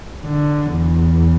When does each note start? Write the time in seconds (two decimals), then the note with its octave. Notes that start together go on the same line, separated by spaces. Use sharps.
0.24 D3
0.74 E2